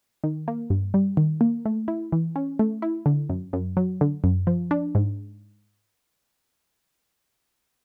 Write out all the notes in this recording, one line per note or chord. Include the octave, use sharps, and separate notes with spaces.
D#3
A#3
G2
G3
D#3
A#3
A3
E4
E3
C#4
A3
E4
D3
F#2
F#2
F#3
D3
F#2
F3
D4
G#2